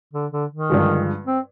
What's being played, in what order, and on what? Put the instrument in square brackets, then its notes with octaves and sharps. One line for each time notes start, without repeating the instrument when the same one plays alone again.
[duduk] D3
D3
D#3
[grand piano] G2 D3 F3 G#3
[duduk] C4